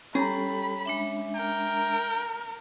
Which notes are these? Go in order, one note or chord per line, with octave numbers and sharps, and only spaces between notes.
G3 C#4 G4 A4 A#5 B5
G#3 D4 E5
A#4 G5